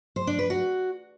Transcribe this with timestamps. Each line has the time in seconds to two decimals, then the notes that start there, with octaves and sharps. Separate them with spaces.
0.16 C5
0.27 D4
0.39 B4
0.50 F#4